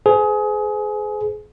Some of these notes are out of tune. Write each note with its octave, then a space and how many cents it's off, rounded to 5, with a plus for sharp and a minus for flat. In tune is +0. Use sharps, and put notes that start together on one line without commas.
G#4 +25 C5 -45